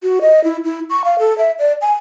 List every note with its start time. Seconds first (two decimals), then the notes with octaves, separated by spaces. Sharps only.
0.03 F#4
0.21 D#5
0.44 E4
0.64 E4
0.90 C#6
1.04 F5
1.19 A4
1.38 E5
1.59 D5
1.81 G#5